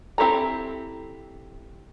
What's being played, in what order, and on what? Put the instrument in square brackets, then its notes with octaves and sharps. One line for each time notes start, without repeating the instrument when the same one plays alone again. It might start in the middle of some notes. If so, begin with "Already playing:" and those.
[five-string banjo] C4 E4 G4 A4 A#5